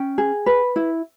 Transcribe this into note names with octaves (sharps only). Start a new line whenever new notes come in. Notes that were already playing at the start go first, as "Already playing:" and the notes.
Already playing: C#4 G5
G#4
B4
E4